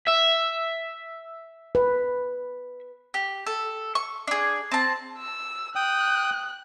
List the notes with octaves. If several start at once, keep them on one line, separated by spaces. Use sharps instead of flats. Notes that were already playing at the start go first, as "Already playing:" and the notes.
E5
B4
G4
A4
C#6
D4 G#4
C4 A5
E6
G5 D#6 F#6